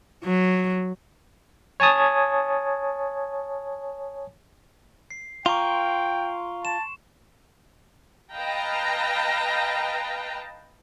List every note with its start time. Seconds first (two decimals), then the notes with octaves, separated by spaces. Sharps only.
0.24 F#3
1.80 C#5 G#5 A5 D#6
5.11 C7
5.46 F4 F5 G5 A#5 C6 C#6
6.65 A5 E7
8.34 B4 D#5 F5 G5 A5 A#5